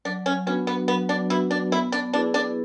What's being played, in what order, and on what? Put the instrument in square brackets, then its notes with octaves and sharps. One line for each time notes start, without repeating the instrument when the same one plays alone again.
[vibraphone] F#3 [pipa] D4
[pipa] C#4
[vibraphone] B3 D4 F#4 B4 [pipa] C#4
[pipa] B3
[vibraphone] F#3 [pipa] B3
[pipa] D4
[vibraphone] B3 D4 F#4 B4 [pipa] E4
[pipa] D4
[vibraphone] B3 [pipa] E4
[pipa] D4
[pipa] D4 [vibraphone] E4 G#4 B4
[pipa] D4